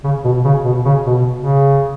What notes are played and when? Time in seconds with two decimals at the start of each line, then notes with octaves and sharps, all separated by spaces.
0.04 C#3
0.24 B2
0.45 C#3
0.65 B2
0.85 C#3
1.06 B2
1.36 C#3